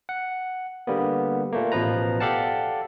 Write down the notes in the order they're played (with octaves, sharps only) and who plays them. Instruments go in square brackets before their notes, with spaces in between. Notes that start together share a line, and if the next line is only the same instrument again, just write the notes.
[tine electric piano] F#5
D3 G3 A#3 B3
A#2 A3 A#3
A1 B2 F3 B4 A#5
G4 A4 D5 F5 F#5 A5